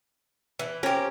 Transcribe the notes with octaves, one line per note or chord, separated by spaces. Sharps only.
E3
C4 C#4 G4 A#4